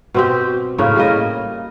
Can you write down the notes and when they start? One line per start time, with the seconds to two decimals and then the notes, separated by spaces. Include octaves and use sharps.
0.14 B2 C4 G4
0.78 A2 C#3 A#3 C#4
0.96 G3 A#3 D#5